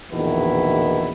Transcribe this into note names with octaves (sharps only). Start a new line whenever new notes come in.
A#1 E2 B2 D#3 E3 E4